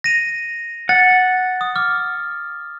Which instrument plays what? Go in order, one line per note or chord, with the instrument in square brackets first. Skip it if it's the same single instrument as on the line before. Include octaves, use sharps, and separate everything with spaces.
[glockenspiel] A#6 D#7 F7
[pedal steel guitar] F#5 [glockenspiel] A6
[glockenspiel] D#6
D6 F6